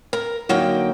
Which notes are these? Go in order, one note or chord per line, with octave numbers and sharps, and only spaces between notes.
A#4
D3 F#3 A#3 D#4 G5